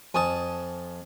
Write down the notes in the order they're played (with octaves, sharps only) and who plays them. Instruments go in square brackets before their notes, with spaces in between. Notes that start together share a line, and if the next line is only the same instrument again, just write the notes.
[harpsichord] F2 A5 [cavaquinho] G#5 D#6